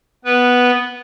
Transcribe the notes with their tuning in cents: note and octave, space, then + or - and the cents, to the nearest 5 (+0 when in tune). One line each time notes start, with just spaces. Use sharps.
B3 +0 B4 -10